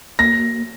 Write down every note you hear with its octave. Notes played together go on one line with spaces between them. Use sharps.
A#3 A#6